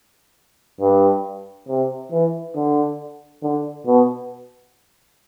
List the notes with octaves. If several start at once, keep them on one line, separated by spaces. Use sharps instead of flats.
G2
C3
E3
D3
D3
B2